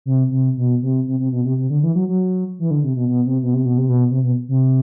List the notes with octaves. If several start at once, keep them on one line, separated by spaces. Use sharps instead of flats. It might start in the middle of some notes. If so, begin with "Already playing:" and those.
C3
C3
B2
C3
C3
C3
B2
C3
C3
D3
E3
F#3
F#3
E3
D3
C3
B2
B2
C3
B2
C3
B2
C3
B2
C3
B2
C3